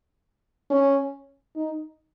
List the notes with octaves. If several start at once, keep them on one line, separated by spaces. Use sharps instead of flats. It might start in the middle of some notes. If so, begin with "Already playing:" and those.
C#4
D#4